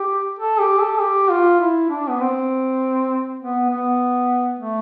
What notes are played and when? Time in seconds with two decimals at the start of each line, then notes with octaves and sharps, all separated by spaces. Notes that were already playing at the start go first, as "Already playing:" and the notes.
Already playing: G4
0.39 A4
0.60 G4
0.80 A4
1.00 G4
1.30 F4
1.60 E4
1.90 D4
2.09 B3
2.20 C4
3.40 B3
3.70 B3
4.60 A3